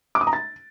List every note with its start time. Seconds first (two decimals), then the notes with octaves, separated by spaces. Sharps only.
0.15 D6
0.21 D#6
0.27 A#5
0.33 A6